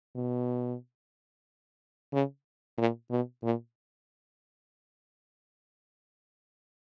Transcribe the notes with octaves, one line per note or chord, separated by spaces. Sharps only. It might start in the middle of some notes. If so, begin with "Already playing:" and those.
B2
C#3
A#2
B2
A#2